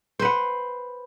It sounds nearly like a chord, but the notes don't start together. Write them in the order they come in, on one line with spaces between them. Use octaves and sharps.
C5 B4 F#5